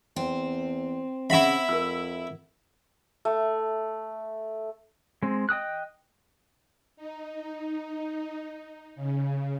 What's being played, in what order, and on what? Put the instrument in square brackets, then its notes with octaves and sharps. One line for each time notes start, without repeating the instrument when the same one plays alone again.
[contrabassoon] E2 [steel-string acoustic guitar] C4
[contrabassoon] C#3 [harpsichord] E4 B5 [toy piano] E5 F#5 C#6
[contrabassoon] F2 [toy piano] A#4 E6
[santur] A3
[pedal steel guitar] G#3 C4
D#5 G5 D#6 F#6
[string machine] D#4
C#3